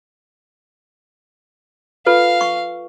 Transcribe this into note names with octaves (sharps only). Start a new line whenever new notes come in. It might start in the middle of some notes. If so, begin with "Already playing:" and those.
F4 A4 B4 F5
C#6